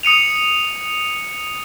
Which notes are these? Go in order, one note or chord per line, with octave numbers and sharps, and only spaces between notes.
D#6 C#7 D#7 F7